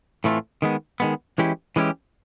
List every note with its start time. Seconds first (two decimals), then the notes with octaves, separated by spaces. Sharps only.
0.24 A2 E3 A3 C4 F4
0.62 D#3 G#3 B3
1.00 D#3 G#3 B3
1.38 E3 G#3 C#4 E4 G4
1.76 E3 G#3 C#4 E4 G4